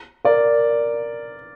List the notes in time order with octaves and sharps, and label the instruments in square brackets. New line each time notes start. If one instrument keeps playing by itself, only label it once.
[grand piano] A#4 D5